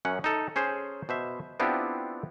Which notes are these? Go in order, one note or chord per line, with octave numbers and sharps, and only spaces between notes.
F#2 C#4 F#5
D#4 A4
C#4 G#4 C5
B2 C5 E5
B3 C4 D4 E4 F4 G4